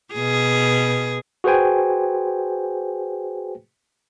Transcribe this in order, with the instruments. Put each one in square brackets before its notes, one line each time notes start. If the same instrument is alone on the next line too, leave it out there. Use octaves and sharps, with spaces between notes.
[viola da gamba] B2 G#4
[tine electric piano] F#4 G#4 B4 C5 G5 G#5